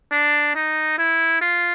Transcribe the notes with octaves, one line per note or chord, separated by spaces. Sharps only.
D4
D#4
E4
F4